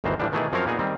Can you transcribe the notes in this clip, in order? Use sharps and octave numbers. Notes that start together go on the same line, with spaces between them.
G1 D2 D#3 E3 C5 A#5
A2 E3 F3 G3 D4
B2 D#3 E3 A3 E4 G#4
F#2 F3 C4 A#4 C#5 F5
A#2 B3 D#4 G#4
D#3 G3 C4